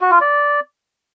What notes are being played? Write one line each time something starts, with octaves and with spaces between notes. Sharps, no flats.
F#4
F4
D5